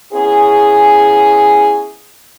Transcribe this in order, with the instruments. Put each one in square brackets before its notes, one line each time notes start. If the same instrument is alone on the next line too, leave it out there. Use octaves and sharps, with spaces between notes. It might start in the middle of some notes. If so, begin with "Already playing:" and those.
[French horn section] B3 C#4 E4 G#4